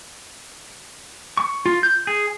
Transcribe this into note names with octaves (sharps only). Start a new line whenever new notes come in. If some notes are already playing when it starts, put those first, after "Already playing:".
C#6
F4
G6
G#4